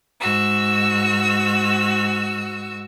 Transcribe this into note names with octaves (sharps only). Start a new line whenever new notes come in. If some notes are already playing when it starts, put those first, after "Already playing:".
G#2 F#4 E6